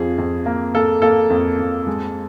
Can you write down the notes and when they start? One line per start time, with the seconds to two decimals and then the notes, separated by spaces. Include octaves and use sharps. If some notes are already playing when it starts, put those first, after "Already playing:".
Already playing: F2 F3 G#4
0.18 F2
0.46 A#3
0.75 A#3 A4
1.02 A#3 A4
1.30 F2
1.59 F2
1.87 G#3